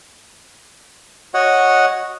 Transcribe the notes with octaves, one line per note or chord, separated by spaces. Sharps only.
F#4 C#5 D#5 F#5